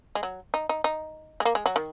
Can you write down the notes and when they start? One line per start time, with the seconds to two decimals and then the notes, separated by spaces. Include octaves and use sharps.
0.15 G#3
0.23 F#3
0.54 D#4
0.69 D#4
0.84 D#4
1.40 G#3
1.45 A#3
1.55 G#3
1.66 F#3
1.76 D#3